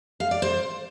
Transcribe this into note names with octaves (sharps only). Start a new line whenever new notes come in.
F5
D5
C5